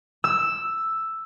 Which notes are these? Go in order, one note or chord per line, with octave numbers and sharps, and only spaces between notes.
E6